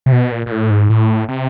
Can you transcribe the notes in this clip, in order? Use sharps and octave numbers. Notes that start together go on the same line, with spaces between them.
C3
B2
A#2
A#2
A2
G#2
A2
C3